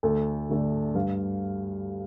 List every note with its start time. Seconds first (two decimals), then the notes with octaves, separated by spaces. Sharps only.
0.03 D2 A4
0.49 D3 A3 D4
0.95 G2 F5